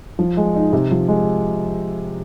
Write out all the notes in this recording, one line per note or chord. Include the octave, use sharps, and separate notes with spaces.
F3
G#3
D#4
C3
F3
G#3